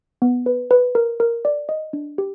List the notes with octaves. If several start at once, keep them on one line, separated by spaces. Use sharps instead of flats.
B3
B4
B4
A#4
A#4
D5
D#5
D4
G4